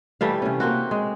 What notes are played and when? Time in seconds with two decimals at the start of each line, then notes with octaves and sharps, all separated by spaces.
0.21 E3 G3 A3 F5
0.42 C3 C#4
0.60 A#3 C4 F#4
0.91 G#3